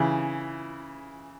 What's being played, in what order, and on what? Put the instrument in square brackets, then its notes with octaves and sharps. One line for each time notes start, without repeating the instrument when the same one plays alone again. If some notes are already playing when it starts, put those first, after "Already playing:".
Already playing: [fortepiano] C#3 E3